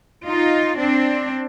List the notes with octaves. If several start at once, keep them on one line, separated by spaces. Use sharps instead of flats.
D#4 F4
C4 D4